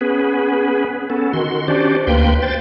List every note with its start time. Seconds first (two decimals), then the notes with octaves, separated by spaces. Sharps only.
0.01 B3 C#4 G#4 B4
1.10 B3 C#4 A4
1.33 D#3 F#4 C6
1.68 C#4 D4 F#4 G4 C5 D5
2.07 D2 A#3 B4 G5 C6
2.42 C5 G5 A6